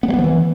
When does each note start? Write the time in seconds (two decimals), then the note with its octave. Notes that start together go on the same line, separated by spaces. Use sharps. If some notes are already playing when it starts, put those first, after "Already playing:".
0.03 B3
0.08 G3
0.14 B3
0.19 F3
0.24 E3